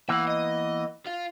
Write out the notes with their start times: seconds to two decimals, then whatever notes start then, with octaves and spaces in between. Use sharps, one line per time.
0.09 E3 A#3 B3 E5 F#5
0.27 D#5
1.06 F4 F5